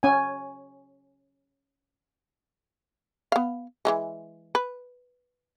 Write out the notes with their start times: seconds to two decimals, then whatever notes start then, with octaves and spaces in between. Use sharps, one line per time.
0.03 C#4 G#5
3.32 B3 F5
3.85 E3 G3 G#3
4.55 B4